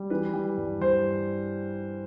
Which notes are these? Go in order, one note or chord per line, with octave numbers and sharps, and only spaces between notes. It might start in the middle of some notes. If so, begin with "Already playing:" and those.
Already playing: G3
E3 B4
G3
G2
G2 C5